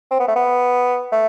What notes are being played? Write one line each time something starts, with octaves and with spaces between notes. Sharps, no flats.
C4
B3
A3
B3
A3